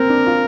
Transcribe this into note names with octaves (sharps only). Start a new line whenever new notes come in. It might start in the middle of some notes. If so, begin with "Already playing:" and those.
Already playing: A#3 C4 A#4
D4
F4